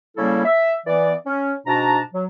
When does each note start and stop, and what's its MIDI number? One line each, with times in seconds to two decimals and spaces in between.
0.17 0.44 49
0.17 0.44 55
0.17 0.44 58
0.17 0.44 61
0.17 0.44 64
0.17 0.44 69
0.45 0.74 76
0.87 1.14 52
0.87 1.14 59
0.87 1.14 74
1.26 1.53 61
1.67 2.00 44
1.67 2.00 47
1.67 2.00 62
1.67 2.00 81
1.67 2.00 82
2.14 2.25 54